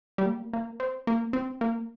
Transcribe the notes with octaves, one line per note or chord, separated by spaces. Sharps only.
G3
A#3
A#3
C4
A#3
C4
A#3